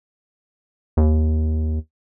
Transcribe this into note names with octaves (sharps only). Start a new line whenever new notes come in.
D#2